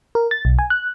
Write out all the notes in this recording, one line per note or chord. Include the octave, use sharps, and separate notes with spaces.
A#4
A6
B1
G#5
F#6